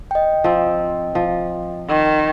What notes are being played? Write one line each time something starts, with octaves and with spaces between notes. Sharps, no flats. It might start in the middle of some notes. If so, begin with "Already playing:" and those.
D#5 G5
F3 C4
F3
D#3